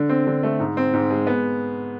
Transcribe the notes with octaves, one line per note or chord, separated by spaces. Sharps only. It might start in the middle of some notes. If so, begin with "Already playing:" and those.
Already playing: D3
C4
D3
A3
G#2
C4
G#2
G#3
B3